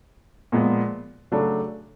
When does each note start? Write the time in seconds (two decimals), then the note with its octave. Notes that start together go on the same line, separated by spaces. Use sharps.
0.52 A#2 F3 G#3 B3
1.32 C#3 F#3 A3 D4